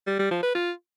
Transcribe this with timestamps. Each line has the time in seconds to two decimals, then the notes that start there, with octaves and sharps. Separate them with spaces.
0.07 G3
0.19 G3
0.31 F3
0.43 B4
0.55 F4